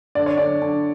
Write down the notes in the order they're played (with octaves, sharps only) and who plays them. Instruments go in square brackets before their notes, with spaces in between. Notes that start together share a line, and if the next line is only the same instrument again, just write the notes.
[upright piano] D3 D5
C#5
D3 D5
D3